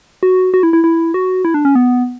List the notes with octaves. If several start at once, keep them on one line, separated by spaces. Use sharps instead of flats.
F#4
F#4
E4
E4
E4
F#4
E4
D4
C#4
B3